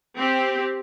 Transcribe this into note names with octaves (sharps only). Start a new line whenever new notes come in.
C4 G4